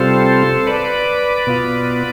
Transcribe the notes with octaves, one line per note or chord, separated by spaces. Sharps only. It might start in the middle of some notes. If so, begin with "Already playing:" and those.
Already playing: C3 G3 C4 F4 A4 C5
B4 D5
B2 B3 F4